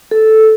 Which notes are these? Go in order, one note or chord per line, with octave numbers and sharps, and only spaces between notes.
A4